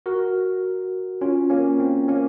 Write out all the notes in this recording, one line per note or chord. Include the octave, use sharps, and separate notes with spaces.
F#4 A#4
C#4 F4
A#3 C#4
C4
A#3 C#4